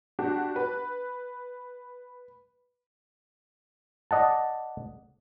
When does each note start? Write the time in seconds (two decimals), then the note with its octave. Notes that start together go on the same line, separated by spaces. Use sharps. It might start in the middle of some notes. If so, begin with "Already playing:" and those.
0.19 D4 F#4 G4
0.56 B4
4.11 D5 D#5 F#5 A5